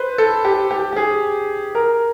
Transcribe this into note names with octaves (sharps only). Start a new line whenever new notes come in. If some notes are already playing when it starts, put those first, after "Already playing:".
Already playing: B4 C5
A4
G4
G4
G4
G#4
A#4